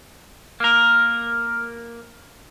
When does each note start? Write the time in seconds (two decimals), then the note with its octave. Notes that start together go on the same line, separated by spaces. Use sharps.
0.60 A#3 A#4